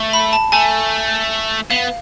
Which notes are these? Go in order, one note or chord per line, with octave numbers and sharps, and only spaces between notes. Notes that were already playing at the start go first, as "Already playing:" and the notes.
Already playing: A3
B5
A5
A3 G#5
B3 F5